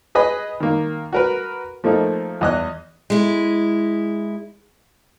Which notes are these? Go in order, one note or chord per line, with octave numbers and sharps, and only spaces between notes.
G#4 B4 D#5 B5
D#3 A#3
F#4 A#4 B4
F3 A3 A#3 D#4
E2 D#5 F#6
G#3 E4